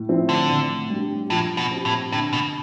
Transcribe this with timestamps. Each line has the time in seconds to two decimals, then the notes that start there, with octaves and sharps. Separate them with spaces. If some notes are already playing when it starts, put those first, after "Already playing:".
Already playing: A2
0.09 F3 C4 E4
0.29 D3
0.49 A2
0.90 G3 D4 G4
1.30 A2 F3
1.57 B2
1.71 C4 G4
1.85 A2
2.12 A2 D3
2.33 B2